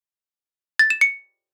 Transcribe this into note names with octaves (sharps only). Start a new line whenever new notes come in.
A6
E7
C#7